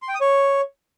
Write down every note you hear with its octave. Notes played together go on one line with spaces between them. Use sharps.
C6
G5
D#6
C#5